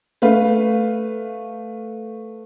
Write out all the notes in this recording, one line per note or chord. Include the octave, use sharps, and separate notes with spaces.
A3 B4 F5